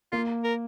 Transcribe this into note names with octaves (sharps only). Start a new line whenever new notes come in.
A#3 F4
A#4